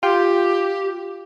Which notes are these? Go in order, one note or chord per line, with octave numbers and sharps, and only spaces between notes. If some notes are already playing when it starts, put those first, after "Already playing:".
F4 G4 G5